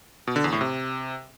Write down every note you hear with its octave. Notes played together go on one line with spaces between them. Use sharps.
B2
D3
E2
A2
C3